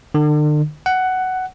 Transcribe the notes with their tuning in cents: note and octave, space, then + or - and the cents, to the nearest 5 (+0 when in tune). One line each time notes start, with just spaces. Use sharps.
D3 +40
F#5 +10